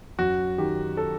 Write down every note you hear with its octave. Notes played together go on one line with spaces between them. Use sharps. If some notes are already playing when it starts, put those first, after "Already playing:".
F#2 F#4
D#3 G4
A4